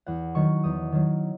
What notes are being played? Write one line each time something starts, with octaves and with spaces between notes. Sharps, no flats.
E2 F#5
D#3 F#3 C#6
E2 D#6
D#3 F#3